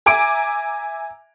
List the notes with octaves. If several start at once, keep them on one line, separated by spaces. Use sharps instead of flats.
E5 G#5 A#5 D6 D7